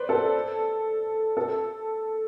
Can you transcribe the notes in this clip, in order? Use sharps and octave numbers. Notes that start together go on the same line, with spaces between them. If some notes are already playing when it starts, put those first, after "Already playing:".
Already playing: B4 C5 D5
A4
A4